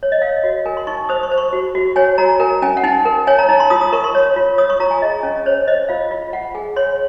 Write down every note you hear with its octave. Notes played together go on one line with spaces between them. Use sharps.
C#5
D#5
C#5 F5
F#4
A#4 G#5
C6
D#4 C#6
C5 D#6
C#6
C5
C#6
F#4
F#4
C#5 G#5
F#4 A#5
A#4 G#5
C#4 G#5
F#5
D#4 G#5
A#4
C#5 G#5
A#5
D#4 A#5
C6
F4 D#6
D#6
A#4 C#6
C6
C#5
F4
C#5 D#6
C#6
F4 A#5
G#5
G#4 D#5
C#4
C5 C#5
C5 D#5
F4 F5
F4
F4 F#5
G#4 G#5
C#5 C6